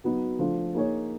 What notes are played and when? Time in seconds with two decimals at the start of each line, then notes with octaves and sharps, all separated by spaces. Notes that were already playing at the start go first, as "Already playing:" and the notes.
0.04 F#3 B3 D#4
0.39 F3 A3 D4 F4
0.75 A#3 D#4 G#4 C#5